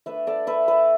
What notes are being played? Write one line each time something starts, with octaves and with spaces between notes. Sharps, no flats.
A3 D4 B4 E5
A4 D5
B4 E5
B4 E5